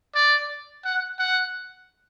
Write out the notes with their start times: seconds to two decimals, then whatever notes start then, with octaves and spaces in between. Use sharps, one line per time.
0.15 D5
0.85 F#5
1.19 F#5